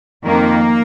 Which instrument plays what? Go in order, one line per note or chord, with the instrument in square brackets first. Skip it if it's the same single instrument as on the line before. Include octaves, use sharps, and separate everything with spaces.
[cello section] F2 D#3 A#3